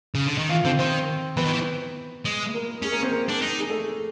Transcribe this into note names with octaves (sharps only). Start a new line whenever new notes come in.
C#3
D3
D#3
E3 F4 F5
D3 C4 C5
D#3 C4 C5
E3 B3 B4
D#3
E3
G#3
A#3 A#4
C#4 G#4
A#3 A#4
C4 C5
A#3 A#4
D4
D#4
G#4
A3 A4